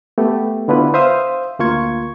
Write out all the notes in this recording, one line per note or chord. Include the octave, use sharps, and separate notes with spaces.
A3 B3 G4
D3 B3 D4 E4 F4 B4
C5 E5 F5 D#6
D2 A#3 F4 C#6 G#6